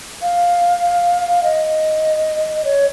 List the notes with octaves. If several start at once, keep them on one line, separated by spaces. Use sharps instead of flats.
F5
D#5
C#5